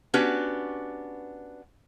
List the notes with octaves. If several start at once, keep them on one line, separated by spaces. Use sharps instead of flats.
B3 C#4 D4 F#4 G4 B4